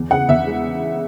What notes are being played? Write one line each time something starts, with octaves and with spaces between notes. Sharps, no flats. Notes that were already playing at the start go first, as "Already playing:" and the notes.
Already playing: E2
C#3 F#5
E2 E5
G#3